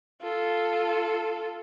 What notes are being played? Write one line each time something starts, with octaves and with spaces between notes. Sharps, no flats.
F4 A4